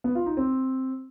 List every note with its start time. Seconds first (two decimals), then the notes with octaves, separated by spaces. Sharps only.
0.04 B3
0.15 F4
0.26 D#4
0.37 C4